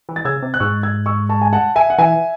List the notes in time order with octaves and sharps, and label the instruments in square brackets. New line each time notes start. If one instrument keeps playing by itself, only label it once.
[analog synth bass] E3
[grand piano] A6
[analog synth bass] C#3 [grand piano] E6 G#6
[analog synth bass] C3
[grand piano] F#6
[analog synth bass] G#2 [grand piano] C#6 E6
[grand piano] E6 G#6
C#6 E6
A5 C#6
G#5
F#5 A5
E5 G#5
F#5
[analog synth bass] E3 [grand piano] E5 G#5